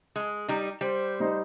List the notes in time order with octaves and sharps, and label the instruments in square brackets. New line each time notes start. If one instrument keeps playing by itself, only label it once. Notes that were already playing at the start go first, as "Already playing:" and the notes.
[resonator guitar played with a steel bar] G#3
G3 D#4
[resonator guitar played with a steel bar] G3 [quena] C5
[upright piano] G3 D#4